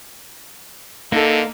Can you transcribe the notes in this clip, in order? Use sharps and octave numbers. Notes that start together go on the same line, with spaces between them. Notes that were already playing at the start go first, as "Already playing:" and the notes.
D3 A#3 D#4 A4